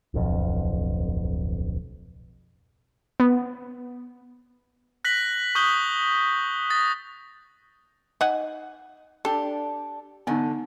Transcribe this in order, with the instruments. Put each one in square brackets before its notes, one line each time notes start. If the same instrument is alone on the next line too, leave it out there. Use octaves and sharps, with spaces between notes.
[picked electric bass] D1 B1 F2
[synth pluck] B3
[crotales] F#6 A#6 B6 F#7
C#6 D#6 F#6 G6 F#7 G7
D#6 A6 A#6
[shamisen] D#4 F#5 G#5
[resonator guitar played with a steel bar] D4 G4 [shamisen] A4
[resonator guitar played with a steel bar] E2 G#2 D3 [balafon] B3 D#4